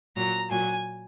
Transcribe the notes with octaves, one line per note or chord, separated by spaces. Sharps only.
A#2 F#3 A#5
A#2 F#3 G#5